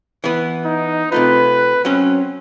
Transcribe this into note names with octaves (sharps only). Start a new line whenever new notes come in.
E3 B3
D#4
C3 A3 F4 B4
F#3 C4 C#4